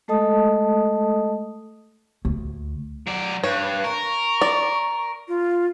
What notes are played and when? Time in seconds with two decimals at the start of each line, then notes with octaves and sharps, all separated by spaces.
0.08 G#3 A3 A4 D#5 A5 D#6
2.25 D2
3.07 F#3 D5
3.44 G2 B4 C#5
3.84 A#4 C#6
4.42 D5
5.28 F4